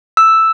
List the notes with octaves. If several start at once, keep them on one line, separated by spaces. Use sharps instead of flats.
E6